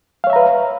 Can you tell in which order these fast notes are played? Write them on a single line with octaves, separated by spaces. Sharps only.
F5 C#5 E5 A#5 B4